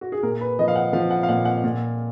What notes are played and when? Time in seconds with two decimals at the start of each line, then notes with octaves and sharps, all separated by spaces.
0.01 F#4
0.12 G#4
0.23 A#2 A#4
0.41 B4
0.59 F3 D#5
0.68 F5
0.76 F#5
0.93 F3 F5
1.11 F#5
1.23 F5
1.29 A#2 F#5
1.45 F#5
1.64 A#2